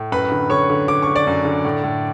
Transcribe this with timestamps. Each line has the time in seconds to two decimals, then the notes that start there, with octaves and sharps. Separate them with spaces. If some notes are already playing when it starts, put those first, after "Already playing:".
Already playing: A2
0.12 F#2 B4 B5
0.32 D3
0.50 D3 C#5 C#6
0.70 D3
0.88 D3 D6
1.02 D3 C#6
1.16 D5 D6
1.27 F#2
1.45 D3
1.65 A2
1.84 A2